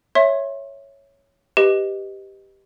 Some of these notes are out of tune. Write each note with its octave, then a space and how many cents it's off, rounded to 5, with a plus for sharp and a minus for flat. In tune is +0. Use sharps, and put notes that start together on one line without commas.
C#5 +0 E5 +0 C6 +35
G4 +0 B4 +0 D#5 +0